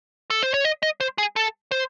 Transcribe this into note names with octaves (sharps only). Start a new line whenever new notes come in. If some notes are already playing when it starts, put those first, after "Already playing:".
A4
C5
C#5
D#5
D#5
C5
G#4
A4
C5